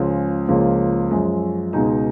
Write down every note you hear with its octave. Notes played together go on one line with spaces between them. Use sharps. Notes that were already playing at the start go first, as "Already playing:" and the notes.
Already playing: C#2 C#3 F3 G#3
C#2 C#3 F3 A#3 F4
F#2 F3 G#3
C#2 B2 G#3 D#4